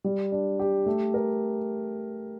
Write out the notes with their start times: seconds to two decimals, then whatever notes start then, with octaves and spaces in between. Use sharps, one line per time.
0.04 G3
0.32 D4
0.59 G4
0.86 A3
1.14 A#4